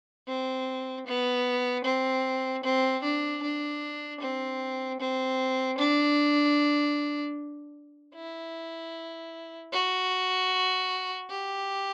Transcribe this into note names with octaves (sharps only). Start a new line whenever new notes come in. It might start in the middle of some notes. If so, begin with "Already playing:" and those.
C4
B3
C4
C4
D4
D4
C4
C4
D4
E4
F#4
G4